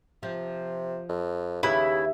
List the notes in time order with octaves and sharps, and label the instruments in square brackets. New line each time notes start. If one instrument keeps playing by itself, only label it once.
[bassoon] C3 [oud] F3
[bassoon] F2
[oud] D#2 G4 B4 [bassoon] C#3 [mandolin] E4